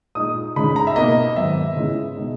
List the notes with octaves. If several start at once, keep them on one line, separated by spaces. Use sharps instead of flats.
A#2 G#3 D#4 D#6
C#3 G#3 D#4 B5
A#5
E5
B2 A#3 D#4 D#5
G#2 D#3 F#3 B3 E5
C#3 G#3 B3 E4
B2 G#3 D#4